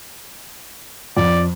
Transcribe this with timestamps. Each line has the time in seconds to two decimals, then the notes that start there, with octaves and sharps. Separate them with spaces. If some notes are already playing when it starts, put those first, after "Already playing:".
1.17 F2 D5